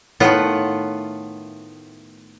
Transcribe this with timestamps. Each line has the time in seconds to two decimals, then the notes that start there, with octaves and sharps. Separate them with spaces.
0.20 A2 D#3 A3 B3 F4 F#5